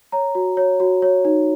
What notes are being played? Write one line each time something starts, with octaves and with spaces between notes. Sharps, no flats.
C#5 A#5
F#4
C#5
F#4
C#5
D#4